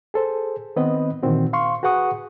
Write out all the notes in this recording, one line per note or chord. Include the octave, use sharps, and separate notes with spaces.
G#4 A4 C5
D#3 B3 C4 B4 D#5
A#2 D#3 E3 C4 F#4
F5 C6 C#6
F#4 G#4 B4 F#5 C#6 D#6